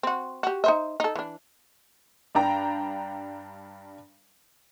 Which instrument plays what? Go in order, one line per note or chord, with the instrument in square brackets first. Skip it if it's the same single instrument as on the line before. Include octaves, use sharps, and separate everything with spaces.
[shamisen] C4 F#4
F#4 G4
D#4 C5 E5
D#4 A4
E3 D4
[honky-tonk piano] G2 D4 G5 A#5